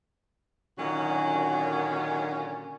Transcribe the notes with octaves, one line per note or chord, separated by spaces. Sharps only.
A#2 D3 D#3 F#3 C#4 F#4